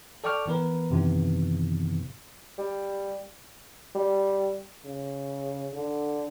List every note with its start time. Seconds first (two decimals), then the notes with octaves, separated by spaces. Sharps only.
0.24 A4 D5 G5 C#6 D6 F6
0.48 E3 B3 A#4 B4
0.91 F#2 C3 D#3 E3 B3
2.58 G3
3.95 G3
4.85 C#3
5.74 D3